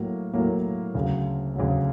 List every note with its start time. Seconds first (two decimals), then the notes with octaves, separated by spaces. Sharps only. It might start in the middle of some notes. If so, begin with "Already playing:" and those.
Already playing: A2 F#3 A#3
0.34 A2 F#3 A#3
0.95 D2 C#3 F#3
1.56 D2 C#3 F#3